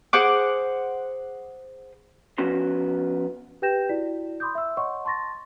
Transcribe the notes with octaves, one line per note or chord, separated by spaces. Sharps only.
G#4 C5 F#5 D6
F3 B3 C#4 F#4 C6
G4 B4 G5 G6 A#6 E7
E4 F#4 D5 B6
B5 C6 D6 D#6 G6
E5 E6
C#5 D#5 F#5 C6 C#6
A5 C6 C#6 A6 A#6